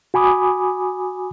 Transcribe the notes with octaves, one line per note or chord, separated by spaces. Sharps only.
F#4 G#5 B5 D6 D#6